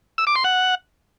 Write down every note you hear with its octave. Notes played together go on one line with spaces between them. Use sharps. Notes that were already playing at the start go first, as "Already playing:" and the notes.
E6
D6
C6
F#5